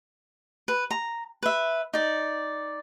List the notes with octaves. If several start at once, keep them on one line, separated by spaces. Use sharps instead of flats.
B4
A#5
B4 E5
D#4 D5